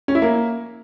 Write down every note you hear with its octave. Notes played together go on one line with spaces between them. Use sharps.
C#4
E4
A#3